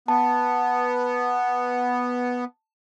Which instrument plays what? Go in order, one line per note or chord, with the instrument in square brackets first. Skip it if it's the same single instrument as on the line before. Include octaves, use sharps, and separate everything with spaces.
[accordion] B3 [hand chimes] A5